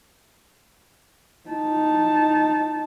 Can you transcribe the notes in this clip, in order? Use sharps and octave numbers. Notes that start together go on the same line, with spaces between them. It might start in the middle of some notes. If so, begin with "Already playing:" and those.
D#4 A5